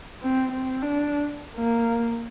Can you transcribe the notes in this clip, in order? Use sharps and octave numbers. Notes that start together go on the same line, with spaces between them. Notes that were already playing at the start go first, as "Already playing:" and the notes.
C4
C4
D4
A#3